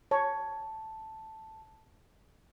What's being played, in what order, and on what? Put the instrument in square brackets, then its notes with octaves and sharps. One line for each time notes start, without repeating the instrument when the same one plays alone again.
[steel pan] C#5 [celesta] A5